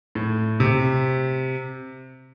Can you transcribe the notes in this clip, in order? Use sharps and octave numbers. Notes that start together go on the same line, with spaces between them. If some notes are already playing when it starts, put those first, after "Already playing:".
A2
C3